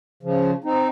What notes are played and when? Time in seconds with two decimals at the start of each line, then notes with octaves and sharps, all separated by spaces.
0.23 C#3 F3
0.64 C4 D#4